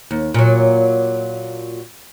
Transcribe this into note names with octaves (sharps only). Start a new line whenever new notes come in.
D#2
A#2 F#3